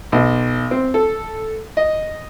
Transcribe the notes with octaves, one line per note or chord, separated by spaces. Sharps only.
B1
C4
A4
D#5